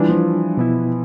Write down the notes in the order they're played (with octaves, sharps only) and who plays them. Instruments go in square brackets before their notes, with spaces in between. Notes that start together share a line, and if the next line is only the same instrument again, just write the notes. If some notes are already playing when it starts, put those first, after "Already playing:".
Already playing: [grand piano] E3 [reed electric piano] G3 D4 F4
[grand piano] F3
[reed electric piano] B2 B3 E4